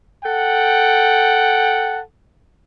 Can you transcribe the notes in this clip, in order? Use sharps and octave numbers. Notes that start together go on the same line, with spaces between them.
A4 F#5 G5